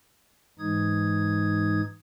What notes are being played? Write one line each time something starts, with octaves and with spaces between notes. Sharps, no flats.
G#2 E3 G#3 D#4 D#6 G#6